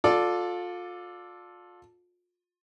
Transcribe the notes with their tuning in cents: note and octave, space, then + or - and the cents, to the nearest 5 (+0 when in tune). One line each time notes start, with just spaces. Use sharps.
F4 +30 A4 +0 D5 +5